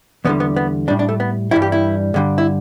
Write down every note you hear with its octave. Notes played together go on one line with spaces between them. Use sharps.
E2 D3 G3 B3
B3
B3
A2 G3 D4
D4
A3
B3
G2 E3 G3 E4
G4
E4
G2 D3 G3
E4